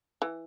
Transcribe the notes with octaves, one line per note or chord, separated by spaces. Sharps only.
E3